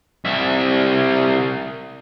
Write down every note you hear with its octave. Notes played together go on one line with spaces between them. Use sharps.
C2 E5